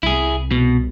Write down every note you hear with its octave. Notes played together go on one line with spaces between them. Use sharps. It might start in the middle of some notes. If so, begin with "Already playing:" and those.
C2 E4 G#4
B2